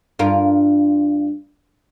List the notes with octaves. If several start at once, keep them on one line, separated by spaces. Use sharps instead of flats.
G2 F4 A#4